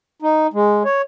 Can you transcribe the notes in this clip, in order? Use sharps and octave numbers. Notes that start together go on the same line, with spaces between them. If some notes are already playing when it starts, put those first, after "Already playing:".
D#4
G#3
C#5